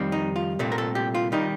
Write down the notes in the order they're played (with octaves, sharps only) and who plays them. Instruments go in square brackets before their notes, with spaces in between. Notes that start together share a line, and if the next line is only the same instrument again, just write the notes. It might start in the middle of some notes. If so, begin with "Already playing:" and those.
Already playing: [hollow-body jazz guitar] F2 D#3 G3 C4
D#4
F4
C2 A#2 A3 C4
A#4
A4
G4
F4
D#3 G3 D#4